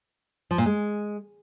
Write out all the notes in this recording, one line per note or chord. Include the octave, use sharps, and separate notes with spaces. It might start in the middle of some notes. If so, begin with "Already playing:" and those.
F3
A#2
G#3